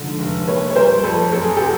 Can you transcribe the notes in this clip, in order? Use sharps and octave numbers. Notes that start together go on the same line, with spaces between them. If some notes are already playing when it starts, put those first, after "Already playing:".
Already playing: G#2 D3 F3
F1
A#3 B4 C#5
C#5
G3 A#4 C5
F2 A4 B4
F#2 A4
G#4
F#3 G4 A4